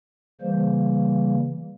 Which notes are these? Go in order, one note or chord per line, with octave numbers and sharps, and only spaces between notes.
C#3 E3 G3 A#3 C5